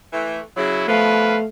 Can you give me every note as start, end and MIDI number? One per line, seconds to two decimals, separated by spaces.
0.13 0.39 52
0.13 0.39 57
0.57 0.86 49
0.57 0.86 54
0.57 0.84 64
0.88 1.40 47
0.88 1.40 53
0.88 1.47 57
0.88 1.38 71
0.88 1.40 77